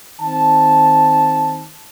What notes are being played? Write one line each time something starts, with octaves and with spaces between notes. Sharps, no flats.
D#3 C4 A5